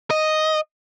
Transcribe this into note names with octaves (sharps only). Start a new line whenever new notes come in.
D#5